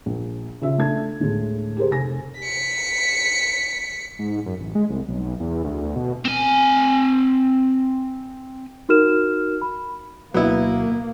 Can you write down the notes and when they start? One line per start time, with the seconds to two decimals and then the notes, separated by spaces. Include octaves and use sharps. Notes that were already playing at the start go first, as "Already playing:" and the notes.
0.06 A#1
0.61 C#3 F4 E5
0.78 A3 D4 G#6
1.20 D2 A2 D3 G#3
1.77 G4 G#4 A#4 C5
1.90 F1 G#5 A#6
2.40 B6 C#7
4.19 G#2
4.46 F#2
4.60 A1
4.75 G#3
4.89 C2
5.08 B1
5.40 E2
5.64 D2
5.96 B2
6.25 C4 G#5
8.89 D#4 F#4 A#4 F6 E7
9.62 B5
10.34 D2 B2 F#3 A#3 B3 E4